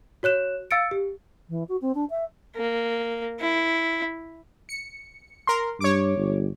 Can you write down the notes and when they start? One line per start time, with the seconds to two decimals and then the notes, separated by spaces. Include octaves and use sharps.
0.23 F#4 C#5 F#6 E7
0.71 F5 E6 A6 C#7 D7
0.91 G4
1.49 E3
1.69 F#4
1.81 C4
1.95 D4
2.10 E5
2.55 A#3
3.40 E4
4.69 C#7
5.47 A#4 C6
5.81 G2 C#5 D6
6.17 G1